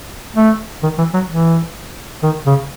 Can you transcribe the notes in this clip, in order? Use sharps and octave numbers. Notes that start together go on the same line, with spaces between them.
A3
D#3
E3
F#3
E3
D#3
C#3